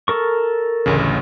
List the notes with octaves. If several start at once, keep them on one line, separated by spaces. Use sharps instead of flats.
A4 A#4 C#6
A1 D2 C#3